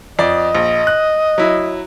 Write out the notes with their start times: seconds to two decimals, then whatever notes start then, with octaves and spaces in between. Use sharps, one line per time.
0.19 F2 D5 D#5
0.55 A#1
0.87 F#6
1.38 F#3 E4